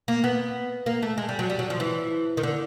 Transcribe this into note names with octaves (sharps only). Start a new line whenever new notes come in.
A#3
B3
A#3
A3
G#3
G3
F#3
G3
F#3
F3
E3
D#3
D3